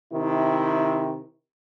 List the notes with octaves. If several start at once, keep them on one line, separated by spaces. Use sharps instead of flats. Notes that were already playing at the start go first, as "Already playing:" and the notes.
C3 D#3 E4